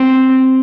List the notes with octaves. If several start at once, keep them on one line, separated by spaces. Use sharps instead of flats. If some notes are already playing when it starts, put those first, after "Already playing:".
Already playing: C4